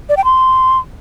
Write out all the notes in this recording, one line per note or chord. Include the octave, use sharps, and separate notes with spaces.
D5
G5
C6